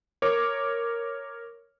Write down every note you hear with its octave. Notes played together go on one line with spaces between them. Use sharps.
A#4 C#5 D6